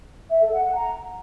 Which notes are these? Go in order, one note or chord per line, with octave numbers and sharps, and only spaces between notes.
E5
A4
F#5
F#5
A#5